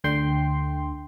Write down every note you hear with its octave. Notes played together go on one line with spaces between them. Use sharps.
D2 D3 G5 C6